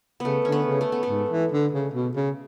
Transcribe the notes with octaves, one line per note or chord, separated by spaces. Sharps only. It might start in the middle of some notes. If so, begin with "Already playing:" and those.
C#3 A3 B3
D3 C#4
B3
C#3
A3
B3
A3
G#2
E3
D3
C#3
B2
C#3